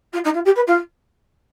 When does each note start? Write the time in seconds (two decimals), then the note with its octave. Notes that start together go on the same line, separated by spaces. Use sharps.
0.13 F4
0.24 D#4
0.34 F4
0.45 G4
0.55 B4
0.67 F4